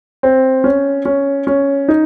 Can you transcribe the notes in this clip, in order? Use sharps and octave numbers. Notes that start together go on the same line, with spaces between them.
C4
C#4
C#4
C#4
D#4